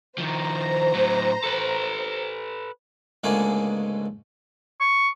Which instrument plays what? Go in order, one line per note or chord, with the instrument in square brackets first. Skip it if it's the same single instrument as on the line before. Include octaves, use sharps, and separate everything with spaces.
[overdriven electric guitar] D#3 F3 [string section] C5 A#5
[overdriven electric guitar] A2 F#3
A4 B4
[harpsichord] C#2 G#2 D3 A3 A#3 G#4
[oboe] C#6